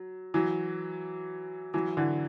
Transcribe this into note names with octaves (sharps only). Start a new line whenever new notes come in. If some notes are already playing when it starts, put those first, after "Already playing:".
Already playing: F#3
E3 F#3
E3 F#3
D3 E3